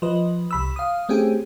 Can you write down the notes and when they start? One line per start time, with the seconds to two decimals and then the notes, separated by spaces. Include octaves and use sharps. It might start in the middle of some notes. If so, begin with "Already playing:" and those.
0.02 F3 B4 D#5
0.51 C2 B5 E6
0.76 F5 D#6
1.09 A3 C4 C#4 G4 G#4